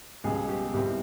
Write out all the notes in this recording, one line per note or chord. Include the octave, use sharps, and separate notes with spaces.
C#2 B2 G3 G#4
G4
C2 B2 G3 C4 E4 G4